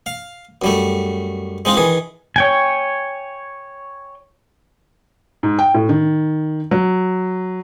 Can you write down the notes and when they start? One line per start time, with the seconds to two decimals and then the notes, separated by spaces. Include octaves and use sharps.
0.06 F5
0.62 F#2 G3 A3
1.65 G#3 C4 D#4 F4
1.77 D#3 E3 G#4
2.36 C#5 G5 G#5
5.43 G#2
5.59 G5
5.74 A2
5.89 D#3
6.71 F#3